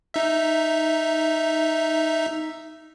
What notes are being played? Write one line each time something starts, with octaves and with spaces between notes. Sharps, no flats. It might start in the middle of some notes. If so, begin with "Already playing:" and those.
D#4 E5